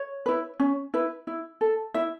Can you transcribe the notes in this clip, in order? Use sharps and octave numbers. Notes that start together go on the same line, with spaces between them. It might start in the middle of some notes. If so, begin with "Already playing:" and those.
Already playing: C#5
E4 B4
C#4
E4 B4
E4
A4
E4 E5